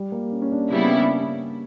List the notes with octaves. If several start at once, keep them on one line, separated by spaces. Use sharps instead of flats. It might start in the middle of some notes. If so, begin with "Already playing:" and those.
Already playing: G3
A#3
C#4
C#4
D4
C#3 G3 B3 E4
D4
D4